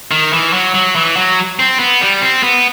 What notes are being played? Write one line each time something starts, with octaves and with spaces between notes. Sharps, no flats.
D#3
E3
F#3
F#3
E3
F#3
C4
B3
G3
C4
B3